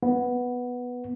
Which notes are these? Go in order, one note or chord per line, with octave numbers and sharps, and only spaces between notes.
B3